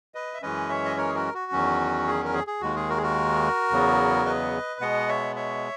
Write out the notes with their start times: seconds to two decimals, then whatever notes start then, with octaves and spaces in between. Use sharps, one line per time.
0.15 B4 D#5
0.34 E5
0.42 F#2 E3 G#3 C#4 B4 D#5
0.69 C#5 E5
0.85 D#5
0.97 A#4 C#5
1.08 G#4
1.15 F#4 A#4
1.34 F#4
1.52 E2 D#3 F#3 C#4
2.07 G#4
2.25 A#4
2.34 G#4
2.47 G#4
2.61 D#2 D#3 G#3 F#4
2.76 G#4
2.89 F#4 A#4
2.97 G#4
3.03 F#4 A#4
3.71 E2 C#3 F#3 B3
4.26 B4 D#5
4.80 B2 G#3 B3 D#5 F#5
5.08 C#5 E5
5.36 C#5 E5